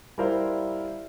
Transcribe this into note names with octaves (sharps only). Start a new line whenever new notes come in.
G3 E4 A#4 C5 D5 F5